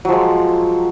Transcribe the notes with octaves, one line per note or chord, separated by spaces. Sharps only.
F3 F#3 G#3